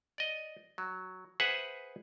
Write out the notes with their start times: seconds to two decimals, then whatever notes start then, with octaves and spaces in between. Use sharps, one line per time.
0.18 D5 D#5
0.78 F#3
1.40 G#4 B4 C5 E5 F#5 G#5